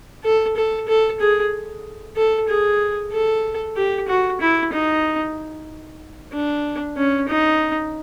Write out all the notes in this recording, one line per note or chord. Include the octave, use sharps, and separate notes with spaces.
A4
A4
A4
G#4
A4
G#4
A4
G4
F#4
E4
D#4
D4
C#4
D#4